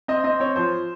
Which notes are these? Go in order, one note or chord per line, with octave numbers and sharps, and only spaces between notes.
C4 D#5
C4 D#5
C4 C#5
F3 C5